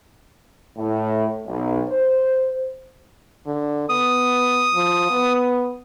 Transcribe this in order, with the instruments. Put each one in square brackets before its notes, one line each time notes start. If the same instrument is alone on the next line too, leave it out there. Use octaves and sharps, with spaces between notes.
[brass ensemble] A2
B1
C5
[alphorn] D3
[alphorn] B3 [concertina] D#6
[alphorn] F3
B3